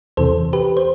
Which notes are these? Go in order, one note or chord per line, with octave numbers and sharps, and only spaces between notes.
E2 C3 E3 A4 C5
G4 B4
C5